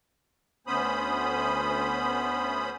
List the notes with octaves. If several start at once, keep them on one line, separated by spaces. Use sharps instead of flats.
D2 B3 C#4 C5 B5 D#6